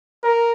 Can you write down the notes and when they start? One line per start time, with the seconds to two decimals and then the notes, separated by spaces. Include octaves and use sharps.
0.23 A#4